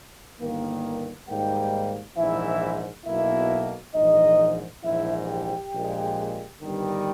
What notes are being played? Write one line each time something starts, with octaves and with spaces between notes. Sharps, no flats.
G1 G2 D#3 A#3
G#2 D#3 G3 A#3 G4 G5
A#1 G#2 E3 E4 E5
B1 B2 A#3 E4 E5
A#1 G#2 E3 D#4 D#5
A#1 G#2 E3 E4 E5
G4 G5
A#1 A#2 G#3
G1 G2 D#3 G3